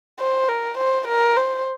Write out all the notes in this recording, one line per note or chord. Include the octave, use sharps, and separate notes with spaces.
C5
A#4
C5
A#4
C5